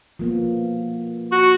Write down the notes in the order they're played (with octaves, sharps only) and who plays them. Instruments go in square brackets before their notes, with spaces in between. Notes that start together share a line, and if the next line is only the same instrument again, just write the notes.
[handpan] F3 A#3 B3
[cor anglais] F#4